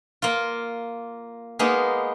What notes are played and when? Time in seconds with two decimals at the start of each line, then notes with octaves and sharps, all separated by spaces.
0.22 A#3 F4
1.59 G#3 A#3 B3 D#4